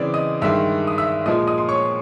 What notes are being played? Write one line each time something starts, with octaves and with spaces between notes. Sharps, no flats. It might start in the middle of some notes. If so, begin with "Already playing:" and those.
Already playing: C#3 E3 G#3 C4 D5 D6
D#5 D#6
G2 D#3 G#3 E5 E6
D#6
E5 E6
A#2 F3 G#3 D#5 D#6
D#5 D#6
C6
C#5 C#6